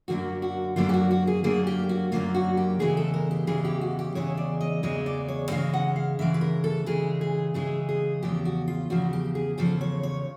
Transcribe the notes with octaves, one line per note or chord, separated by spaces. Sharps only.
F#2 D3 F#3 A#3 F#4
F#4
F#2 D3 F#3 A#3 F4
G4
F#4
F#4
G#4
F#2 D3 F#3 A#3 G#4
G4
F#4
F#2 D3 F#3 A#3 F4
F#4
G4
E2 C#3 E3 G#3 G#4
A4
A#4
G4
E2 C#3 E3 G#3 G#4
G4
F#4
G4
E2 C#3 E3 G#3 C#5
D5
D#5
E2 C#3 E3 G#3 D#5
D5
C#5
C#3 E3 G#3 F5
F#5
F5
C#3 E3 G#3 E5
B4
A#4
A4
C#3 E3 G#3 G#4
G#4
C#3 E3 G#3 G#4
G#4
E2 C#3 F3 G4
F#4
F4
E2 C#3 F3 F#4
G4
G#4
E2 C#3 F3 A4
C#5
C#5